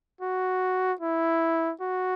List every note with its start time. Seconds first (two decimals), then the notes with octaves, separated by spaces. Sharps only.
0.21 F#4
1.00 E4
1.81 F#4